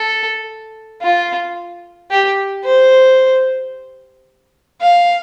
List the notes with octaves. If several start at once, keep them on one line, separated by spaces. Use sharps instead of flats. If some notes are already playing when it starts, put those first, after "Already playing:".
Already playing: A4
F4
G4
C5
F5